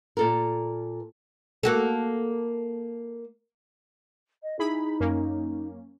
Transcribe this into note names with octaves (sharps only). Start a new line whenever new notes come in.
A#2 A4 A#4
A#3 F#4 A4
D#5
D#4 E4 G#4 B5
F#2 A#3 C#4